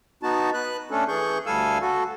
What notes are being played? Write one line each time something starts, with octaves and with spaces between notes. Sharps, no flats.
B3 D#4 F#4 A5
B4 F#6
A3 C#4 D4 A4
E3 G#4 C#6 G6
D2 G3 A4 F5 G#5 E6
F#4 A4